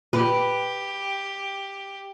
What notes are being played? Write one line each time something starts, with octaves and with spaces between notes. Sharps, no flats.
A#2 G4 B4